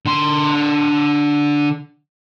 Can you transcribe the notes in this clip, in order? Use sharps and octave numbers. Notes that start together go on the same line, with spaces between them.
D3 C6